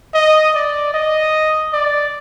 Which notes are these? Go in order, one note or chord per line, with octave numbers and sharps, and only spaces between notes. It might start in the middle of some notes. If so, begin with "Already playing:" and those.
D#5
D5
D#5
D5